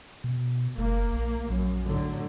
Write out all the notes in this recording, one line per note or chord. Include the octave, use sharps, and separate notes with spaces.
B2
F#1 A#3
A#1
A#1 F#2
A2 D3 F#3